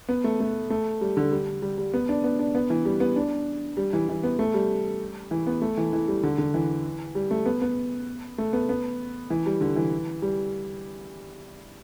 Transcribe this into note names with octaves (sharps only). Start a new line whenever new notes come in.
B3
A3
A3
A3
G3
D3
G3
G3
G3
B3
D4
B3
D4
B3
E3
G3
B3
D4
G3
E3
E3
B3
A3
G3
E3
B3
A3
E3
E3
G3
D3
D3
E3
G3
A3
B3
B3
A3
B3
B3
E3
G3
D3
E3
G3